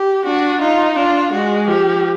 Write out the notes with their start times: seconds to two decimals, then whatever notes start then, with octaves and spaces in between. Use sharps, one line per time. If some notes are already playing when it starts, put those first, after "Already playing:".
Already playing: G4
0.25 D4 F#4
0.61 D#4 F4
0.96 D4 F4
1.33 G#3 F#4
1.67 F3 G4